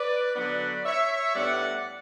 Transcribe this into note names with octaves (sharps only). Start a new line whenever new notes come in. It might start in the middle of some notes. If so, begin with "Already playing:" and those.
Already playing: B4 D5
D3 F#3 B3 D4 B4 D5
C#5 E5
A2 G3 B3 D4 D5 F#5